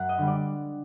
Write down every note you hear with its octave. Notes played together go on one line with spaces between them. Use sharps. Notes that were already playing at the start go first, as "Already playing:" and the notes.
Already playing: F#2 F#5
D#5
D3 G3
D5